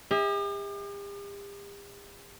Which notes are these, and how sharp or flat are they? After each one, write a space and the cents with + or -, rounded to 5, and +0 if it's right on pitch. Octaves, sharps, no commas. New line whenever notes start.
G4 +45 E5 -40